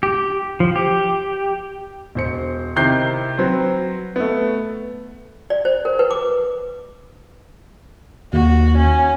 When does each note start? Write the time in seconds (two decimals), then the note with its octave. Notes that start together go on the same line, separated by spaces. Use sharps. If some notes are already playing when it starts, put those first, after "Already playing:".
0.03 G4
0.60 F3
0.76 G4
2.15 E1 C5 C#7
2.76 C3 D#3 E4 G6 C7
3.38 F#3 C4 B4 C5
4.16 A3 B3
5.50 D5
5.65 C5
5.85 A#4
5.99 B4
6.11 D6
8.33 D#2 F#4
8.78 C#4